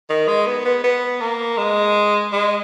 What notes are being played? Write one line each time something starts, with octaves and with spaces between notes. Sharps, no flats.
D#3
G#3
B3
B3
B3
A#3
G#3
G#3